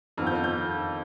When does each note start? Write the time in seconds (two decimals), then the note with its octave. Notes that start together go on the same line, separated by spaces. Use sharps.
0.18 F2 D#3 B3 F6
0.27 G6
0.35 F6
0.44 G6